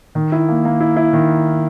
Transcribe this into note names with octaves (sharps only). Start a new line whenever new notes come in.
D#3
E4
A#3
A#3
E4
E4
D#3